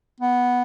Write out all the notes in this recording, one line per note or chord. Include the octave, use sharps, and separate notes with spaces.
B3